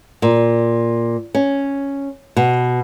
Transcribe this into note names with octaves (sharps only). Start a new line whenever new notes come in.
A#2
C#4
B2